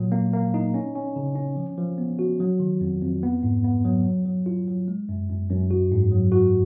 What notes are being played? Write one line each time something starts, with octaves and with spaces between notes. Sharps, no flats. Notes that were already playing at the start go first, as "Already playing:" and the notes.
Already playing: A#2 F#3
A#3
A#3
D#4
C#4
C#4
C#3
C#4
F3
F3
B3
F#4
F#3
D#3
F2
F2
B3
G#2
B3
F#3
F#3
F#3
F4
F#3
G#3
F#2
F#2
F#2
F#4
G#2
F#3
F#4